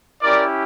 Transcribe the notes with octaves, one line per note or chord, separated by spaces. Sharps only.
C#4 E4 G4 A#4 D5